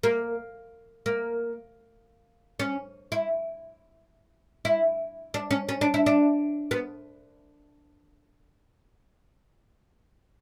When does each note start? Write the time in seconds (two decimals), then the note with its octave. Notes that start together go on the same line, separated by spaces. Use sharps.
0.03 A#3
1.06 A#3
2.59 C#4
3.12 E4
4.65 E4
5.34 D4
5.51 C#4
5.69 C#4
5.81 D4
5.94 E4
6.06 D4
6.71 B3